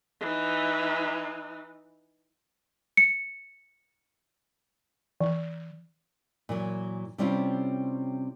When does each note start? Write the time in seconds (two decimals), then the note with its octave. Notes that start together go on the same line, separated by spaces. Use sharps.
0.21 E3 D#4
2.97 C#7
5.21 E3
6.49 A#2 E3 F#3
7.18 C3 G3 C4 C#4 E4 F4